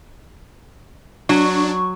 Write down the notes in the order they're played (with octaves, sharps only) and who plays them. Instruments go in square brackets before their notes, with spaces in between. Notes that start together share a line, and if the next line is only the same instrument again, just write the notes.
[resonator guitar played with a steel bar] F#3 [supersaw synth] D4 [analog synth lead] C#6